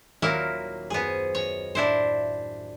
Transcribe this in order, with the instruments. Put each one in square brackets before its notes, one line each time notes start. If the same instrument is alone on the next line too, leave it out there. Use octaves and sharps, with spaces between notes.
[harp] D#1 C6 F6 [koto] F#3 A#3 E4
[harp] F#2 C5 [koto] B3 G#4
[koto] C#5 [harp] D#5
[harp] A2 [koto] D4 E4 C5